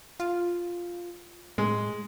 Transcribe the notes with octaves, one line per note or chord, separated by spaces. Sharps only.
F4
A2 G#3